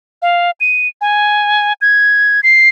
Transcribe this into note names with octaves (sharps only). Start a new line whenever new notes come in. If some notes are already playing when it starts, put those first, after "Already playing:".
F5
D#7
G#5
G#6
C7